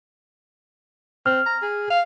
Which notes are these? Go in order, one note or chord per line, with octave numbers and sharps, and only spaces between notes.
C4 F6
A#5
G#4
F5